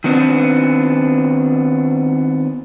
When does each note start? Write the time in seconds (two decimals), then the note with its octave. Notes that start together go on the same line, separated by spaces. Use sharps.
0.04 D#3 B3 C4 D4